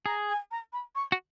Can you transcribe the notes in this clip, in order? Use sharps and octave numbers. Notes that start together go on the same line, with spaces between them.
G#4 A#5
G#5
A#5
B5
C#6
F#4